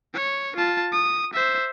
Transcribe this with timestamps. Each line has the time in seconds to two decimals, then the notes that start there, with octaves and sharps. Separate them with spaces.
0.14 C#5
0.57 F4 A5
0.92 D#6
1.33 C5 E5